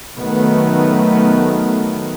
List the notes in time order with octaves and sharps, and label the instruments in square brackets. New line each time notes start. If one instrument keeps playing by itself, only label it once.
[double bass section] D#3 F#3 A3 B3